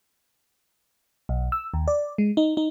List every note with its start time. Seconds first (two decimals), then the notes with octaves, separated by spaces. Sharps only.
1.29 B1
1.52 E6
1.74 D#2
1.88 D5
2.18 G#3
2.37 D#4
2.57 D#4